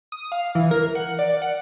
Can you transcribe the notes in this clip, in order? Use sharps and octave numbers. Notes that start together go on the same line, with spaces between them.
D#6
F5
E3
A#4
F#5
D5
F#5